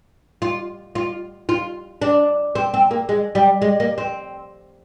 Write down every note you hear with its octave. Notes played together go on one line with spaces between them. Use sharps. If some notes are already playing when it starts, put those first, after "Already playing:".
F4
F4
F4
D4
C4
C4
A#3
G#3
G3
G#3
A#3
C4